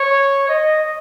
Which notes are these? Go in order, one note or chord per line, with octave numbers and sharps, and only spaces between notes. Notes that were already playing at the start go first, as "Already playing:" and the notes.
Already playing: C#5
D#5